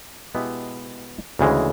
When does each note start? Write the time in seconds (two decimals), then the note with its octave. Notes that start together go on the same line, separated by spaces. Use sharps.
0.35 B2 G#3 B3 E4 G4
1.39 D2 C#3 E3 G#3